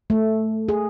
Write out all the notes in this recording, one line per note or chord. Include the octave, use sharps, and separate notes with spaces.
A3
G#4